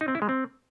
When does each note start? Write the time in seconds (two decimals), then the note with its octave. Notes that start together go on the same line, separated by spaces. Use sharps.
0.01 D#4
0.08 C4
0.15 E4
0.22 G#3
0.29 C4